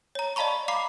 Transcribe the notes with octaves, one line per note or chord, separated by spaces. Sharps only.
C#5 A#5
D5 D#5 F5 A5 B5 C#6
F5 A#5 B5 D6 C7